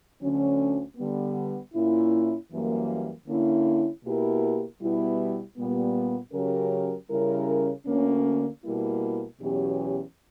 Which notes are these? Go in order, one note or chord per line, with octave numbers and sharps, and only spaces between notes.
D2 D3 F#3 C#4
D3 G3 B3
A#2 A#3 C#4 E4
F#2 E3 G3 A#3
D3 A#3 C#4 E4
B2 A#3 E4 G4 A#4
B2 G3 B3 E4
A#2 G3 B3
C#3 F#3 C#4 G4 A#4
C#3 G3 C#4 E4 A#4
D2 D3 A#3 C#4
B2 G3 A#3 E4
E2 B2 F#3 C#4 G4